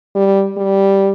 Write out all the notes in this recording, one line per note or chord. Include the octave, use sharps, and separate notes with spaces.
G3
G3